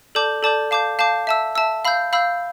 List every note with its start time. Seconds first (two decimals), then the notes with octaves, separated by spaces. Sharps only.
0.15 A4 D5 A5 D6 G6
0.43 A4 D5 A5 D6 G6
0.71 F5 A5 D6 G6
0.99 F5 A5 D6 G6
1.27 E5 A5 E6
1.55 E5 A5 E6
1.85 F5 B5 E6 G6
2.13 F5 B5 E6 G6